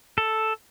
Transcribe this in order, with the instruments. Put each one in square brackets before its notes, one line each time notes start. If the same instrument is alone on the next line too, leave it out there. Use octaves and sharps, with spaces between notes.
[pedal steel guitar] A4